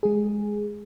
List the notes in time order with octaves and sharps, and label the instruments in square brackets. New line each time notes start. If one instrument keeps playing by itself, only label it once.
[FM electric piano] G#3 G#4